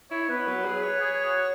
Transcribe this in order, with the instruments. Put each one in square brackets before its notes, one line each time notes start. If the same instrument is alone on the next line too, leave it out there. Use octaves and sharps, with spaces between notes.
[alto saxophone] E4 [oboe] C#5
[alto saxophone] B3 [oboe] B4
[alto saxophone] F#3
G#4
C#5
[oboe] G#4
F#4